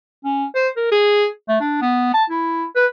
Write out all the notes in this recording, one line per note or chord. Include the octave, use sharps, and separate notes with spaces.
C#4
C5
A#4
G#4
A3
D4
B3
A5
E4
B4